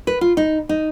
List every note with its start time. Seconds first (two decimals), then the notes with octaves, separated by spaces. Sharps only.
0.07 B4
0.21 F4
0.37 D#4
0.69 D#4